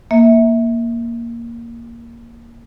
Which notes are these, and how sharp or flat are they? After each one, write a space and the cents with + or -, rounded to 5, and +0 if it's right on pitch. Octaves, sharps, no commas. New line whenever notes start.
A#3 +0 E5 -20